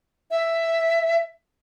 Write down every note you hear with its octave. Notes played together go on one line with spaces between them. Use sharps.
E5